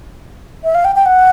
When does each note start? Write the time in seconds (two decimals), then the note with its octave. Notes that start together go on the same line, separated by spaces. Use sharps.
0.64 E5
0.75 F5
0.85 G5
0.96 G5
1.06 F#5